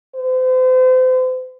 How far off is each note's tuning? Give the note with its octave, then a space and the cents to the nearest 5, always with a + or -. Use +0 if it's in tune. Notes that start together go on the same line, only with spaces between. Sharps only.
C5 -40